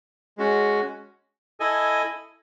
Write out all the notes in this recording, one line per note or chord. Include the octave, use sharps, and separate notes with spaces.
G#3 C#4 F#4
E4 A4 D#5 G#5